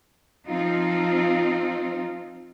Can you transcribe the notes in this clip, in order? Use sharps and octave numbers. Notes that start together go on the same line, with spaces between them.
F3 C4 D#4 F4